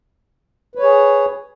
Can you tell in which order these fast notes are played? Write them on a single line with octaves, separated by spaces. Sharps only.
B4 C#5 G#4